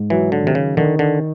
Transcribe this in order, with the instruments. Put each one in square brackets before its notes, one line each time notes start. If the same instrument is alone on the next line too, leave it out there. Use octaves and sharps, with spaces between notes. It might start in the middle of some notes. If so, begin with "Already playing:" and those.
Already playing: [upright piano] G#2
[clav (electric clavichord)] E3 [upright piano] F#3
[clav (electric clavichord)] D3
[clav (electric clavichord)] C3 [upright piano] D#3
[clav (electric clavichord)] C#3
[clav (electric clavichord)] D3 [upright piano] D#3
[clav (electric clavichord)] D3